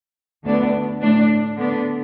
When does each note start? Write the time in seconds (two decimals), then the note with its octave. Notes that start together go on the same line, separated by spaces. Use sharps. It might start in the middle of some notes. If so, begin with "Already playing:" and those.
0.45 D2 D3 B3 D4
1.01 A2 A3 D4
1.56 D3 B3 D4